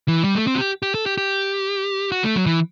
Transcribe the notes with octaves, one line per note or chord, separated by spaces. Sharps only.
E3
G3
A3
C4
F#4
G4
G4
A4
G4
G4
F#4
A3
F#3
E3